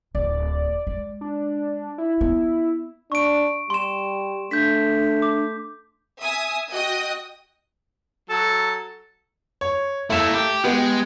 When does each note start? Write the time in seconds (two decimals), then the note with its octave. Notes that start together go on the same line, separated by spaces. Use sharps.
0.15 D1 D5
0.87 G#3
1.21 D4
1.98 E4
2.21 B3
3.12 D4 C#6 D7
3.70 G3 C6 E7
4.51 A3 D4 G6 B6
5.22 D6
6.22 E5 G#5 D#6
6.73 F#4 D#5 G5 D#6
8.30 F#3 A4
9.61 C#5
10.10 A3 A#3 E4 E7
10.34 G4
10.64 G#3 B3 G4